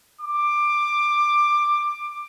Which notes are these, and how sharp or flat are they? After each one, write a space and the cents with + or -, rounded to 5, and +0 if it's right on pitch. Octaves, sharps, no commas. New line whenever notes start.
D6 +15